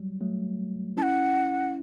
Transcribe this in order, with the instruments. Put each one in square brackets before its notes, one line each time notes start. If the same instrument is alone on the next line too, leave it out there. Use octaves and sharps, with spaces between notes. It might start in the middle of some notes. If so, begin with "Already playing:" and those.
Already playing: [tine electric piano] F#3 G3
F#3 A3
[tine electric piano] C#4 E4 [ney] A5
[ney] F#5